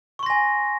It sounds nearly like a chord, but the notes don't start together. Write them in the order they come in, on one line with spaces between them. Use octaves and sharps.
C#6 C6 A#6 G#5